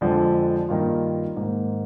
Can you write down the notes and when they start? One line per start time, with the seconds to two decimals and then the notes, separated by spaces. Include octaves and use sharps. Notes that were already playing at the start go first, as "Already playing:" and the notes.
0.01 F2 D3 F3 G#3 D4
0.69 G2 D#3 A#3 F4
1.36 G#2 D#3 A#3